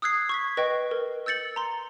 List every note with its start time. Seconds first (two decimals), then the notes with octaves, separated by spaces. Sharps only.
0.02 D#6 E6 F#6 G#6 C7
0.29 C#6 G#6 B6
0.57 B4 D#5 G5 C#6
0.91 A#4
1.26 E6 G6 A6 C#7 F#7
1.56 A#5 C6